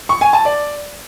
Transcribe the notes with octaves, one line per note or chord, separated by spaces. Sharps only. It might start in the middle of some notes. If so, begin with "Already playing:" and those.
C#6
G#5
A5
D5